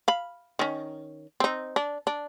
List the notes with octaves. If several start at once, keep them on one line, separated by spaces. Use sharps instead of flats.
F5 B5
D#3 C#4
C4 D#4
D4
D4